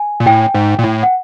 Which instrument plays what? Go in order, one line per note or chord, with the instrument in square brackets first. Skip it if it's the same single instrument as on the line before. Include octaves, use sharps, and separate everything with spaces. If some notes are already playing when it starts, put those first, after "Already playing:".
Already playing: [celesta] G#5
[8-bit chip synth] A#2
[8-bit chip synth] A2 [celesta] G5
[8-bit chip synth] G#2
A#2
A2
[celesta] F#5